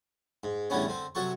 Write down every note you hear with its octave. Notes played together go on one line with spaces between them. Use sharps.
G#2
E2 A2 D3 G3 B3 C#4
D3 C4
C3 F#3 F#4 A4 C#6